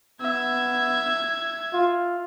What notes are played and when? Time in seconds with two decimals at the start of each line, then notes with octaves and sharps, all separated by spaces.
0.21 B3 E5 G#6
1.73 F4